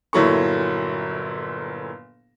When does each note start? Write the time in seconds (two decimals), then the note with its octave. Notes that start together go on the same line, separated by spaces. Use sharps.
0.13 G1 A#2 F#3 E4 A4 C#6